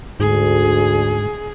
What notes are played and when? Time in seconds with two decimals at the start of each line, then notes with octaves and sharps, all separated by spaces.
0.20 D2 G#2 G#4